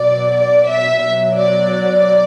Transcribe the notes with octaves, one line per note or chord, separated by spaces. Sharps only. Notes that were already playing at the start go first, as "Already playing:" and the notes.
Already playing: B2 F#3 D5
D5
E5
B2 F#3
D5
D5